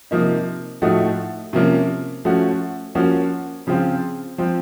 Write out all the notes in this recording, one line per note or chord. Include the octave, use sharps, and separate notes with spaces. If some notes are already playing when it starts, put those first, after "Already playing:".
C3 F3 A#3 D#4
A2 F3 A3 D#4 F#4
C3 F3 A#3 C#4
F3 A3 C#4 F#4
F3 A#3 C#4 F#4
C#3 F3 C4 F4
F3 C4